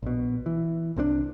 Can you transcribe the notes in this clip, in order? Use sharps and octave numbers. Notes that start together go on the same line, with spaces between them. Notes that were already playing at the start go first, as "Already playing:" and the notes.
A#1 B2
E3
C2 C3 F#3 D4